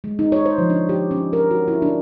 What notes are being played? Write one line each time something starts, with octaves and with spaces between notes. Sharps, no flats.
G#3
D#4
C#5
C5
F3
D4
G4
C#4
A#4
F#4
E4
D4